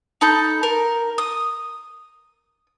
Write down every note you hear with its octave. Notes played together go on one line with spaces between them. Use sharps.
D#4 A4 B5 G6
A#4
D#6